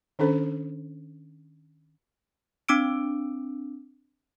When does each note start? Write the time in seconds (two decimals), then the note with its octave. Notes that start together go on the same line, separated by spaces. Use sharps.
0.19 D#3 C#4 D4 A4 C5
2.69 C4 D4 D6 E6 D7